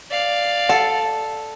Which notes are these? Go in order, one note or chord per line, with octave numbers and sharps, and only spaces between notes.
D5 F5
A4 F#5